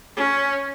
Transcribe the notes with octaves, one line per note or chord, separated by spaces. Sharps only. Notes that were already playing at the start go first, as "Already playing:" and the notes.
C#4